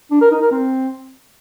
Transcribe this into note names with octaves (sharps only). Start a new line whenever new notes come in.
D4
A#4
D#4
A#4
C4